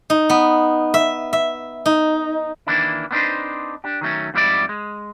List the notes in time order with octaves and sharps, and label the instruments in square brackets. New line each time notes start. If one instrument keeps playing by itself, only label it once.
[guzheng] D#4
B3
E5
E5
D#4
[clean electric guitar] D#3 E3 A#3 D4 E4
B3 C4 D4 D#4 B4 C5
D4 G4
D#3 F#3 A3 C#4
F2 G#2 G3 E4 F#4 D5
G#3